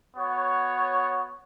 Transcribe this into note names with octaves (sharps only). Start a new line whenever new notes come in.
B3 F#4 C#5